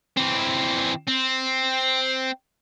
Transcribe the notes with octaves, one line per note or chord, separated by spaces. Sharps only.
E3 C4
C4